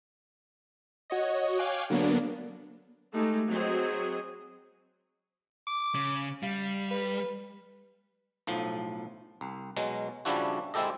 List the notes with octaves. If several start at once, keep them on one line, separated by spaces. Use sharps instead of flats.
F#4 C#5 D#5
C#5 F5 G5 G#5 D6 F#6
D3 F#3 A#3 B3 D4
G#3 A3 D#4 G4
F#3 C4 G#4 D#5
D6
C#3
G3 F5
B4
B1 A2 F3
C2
B2 F#3 G#3
C#3 F3 G3 D4 E4 F#4
G#3 C4 E4 G4 A4 D#5